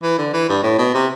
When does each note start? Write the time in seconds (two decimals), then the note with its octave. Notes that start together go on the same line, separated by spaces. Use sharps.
0.03 E3
0.18 D3
0.33 E3
0.49 G2
0.63 A2
0.78 B2
0.94 C3